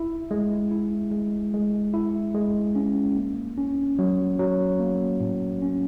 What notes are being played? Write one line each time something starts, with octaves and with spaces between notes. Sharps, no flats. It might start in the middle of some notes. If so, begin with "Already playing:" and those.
Already playing: E4
G#3
E4
G#3
G#3
E4
G#3
C#4
A#3
C#4
F#3
F#3
A#3
A2
C#4